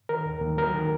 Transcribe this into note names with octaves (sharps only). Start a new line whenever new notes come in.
D#3 A#4
D#2
D#2
F#3 A#4
D#3